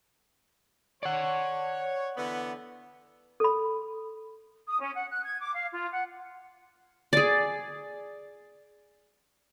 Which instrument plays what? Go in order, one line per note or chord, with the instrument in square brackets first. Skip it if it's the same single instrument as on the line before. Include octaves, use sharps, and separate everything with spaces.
[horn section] C#5 [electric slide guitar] D5 F#5
[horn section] D3 E3 B3
[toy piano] A4 B5
[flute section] D#6
C#4
F#5
F#6
G#6
D6
F5
F4
F#5
[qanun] G#4 D5